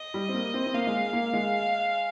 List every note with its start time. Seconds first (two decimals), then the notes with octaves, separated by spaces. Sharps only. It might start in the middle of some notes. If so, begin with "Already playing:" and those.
Already playing: D#5
0.14 G3
0.29 C4
0.34 A#3
0.54 C4
0.66 C4
0.74 A#3 F5
0.87 G#3
1.13 A#3
1.33 G#3